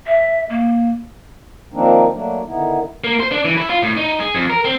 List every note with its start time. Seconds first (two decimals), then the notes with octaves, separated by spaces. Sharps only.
0.06 E5
0.50 A#3
1.73 D#3 F3 A#3 C4 D4 D#4
2.12 F#3 A3 A#3 D4
2.47 D3 D#3 B3 D#4 E4
3.04 A#3
3.20 C5
3.31 D4
3.45 E3
3.58 E4
3.70 F4
3.82 A2
3.97 D#4
4.20 G#4
4.34 F2
4.50 A#4
4.65 C4